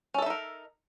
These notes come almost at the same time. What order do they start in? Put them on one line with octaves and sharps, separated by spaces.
C#4 A4 E5 D#4 A#4